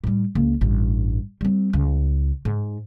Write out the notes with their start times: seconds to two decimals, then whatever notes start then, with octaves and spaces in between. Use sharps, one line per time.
0.04 A2 G3
0.35 C#2 A#3
0.61 A1 G2
1.41 G3 C4
1.73 C#2
2.45 G#2